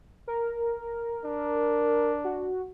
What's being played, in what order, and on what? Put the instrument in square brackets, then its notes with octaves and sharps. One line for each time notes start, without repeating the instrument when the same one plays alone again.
[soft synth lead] A#4
[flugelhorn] D4
[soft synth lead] F#4